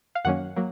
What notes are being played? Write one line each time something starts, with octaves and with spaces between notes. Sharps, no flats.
F5
F#2 D#3 F#3 A#3 C#4 F#5
F#3 A#3